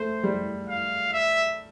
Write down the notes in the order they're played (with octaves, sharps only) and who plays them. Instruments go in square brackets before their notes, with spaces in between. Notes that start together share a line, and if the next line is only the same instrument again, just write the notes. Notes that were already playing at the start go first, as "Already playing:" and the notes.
Already playing: [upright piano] A3 [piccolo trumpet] C5
[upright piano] G3
[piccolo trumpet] F5
E5